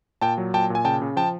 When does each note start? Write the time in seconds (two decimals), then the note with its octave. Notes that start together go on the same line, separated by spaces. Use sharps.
0.21 A#2 G5 A5
0.38 F#3
0.54 A#2 G5 A5
0.70 A#2 G#5
0.85 C#3 G5 A5
1.02 C#3
1.16 F3 G5 A5